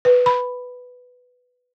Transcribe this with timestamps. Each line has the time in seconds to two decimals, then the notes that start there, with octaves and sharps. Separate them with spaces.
0.05 B4
0.26 B5